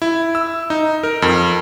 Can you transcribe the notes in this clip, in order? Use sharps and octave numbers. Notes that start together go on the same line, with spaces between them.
E4
E6
D#4
A#4
F2